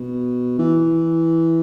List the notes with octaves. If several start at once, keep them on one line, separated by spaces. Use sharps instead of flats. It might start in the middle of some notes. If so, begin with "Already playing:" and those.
Already playing: B2
E3